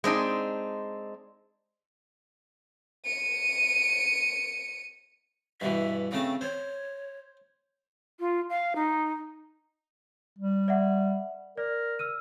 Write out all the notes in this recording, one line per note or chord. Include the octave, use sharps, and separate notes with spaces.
G#3 C4 D4 D#4
C#7 D#7
G2 B2 E3 E5
C#3 A3 C4 A5
C5 C#5
F4
F5
D#4
G3
D5 E5 F#5
A#4 D5
E6 F6 D#7